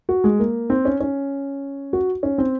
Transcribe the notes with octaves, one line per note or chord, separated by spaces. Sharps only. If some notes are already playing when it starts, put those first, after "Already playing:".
F#4
G#3
A#3
C4
C#4
C#4
F#4
C#4
C4